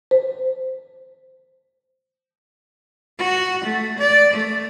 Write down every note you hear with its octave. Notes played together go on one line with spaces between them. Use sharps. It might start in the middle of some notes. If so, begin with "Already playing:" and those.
C5
F#4
A3
D5
A3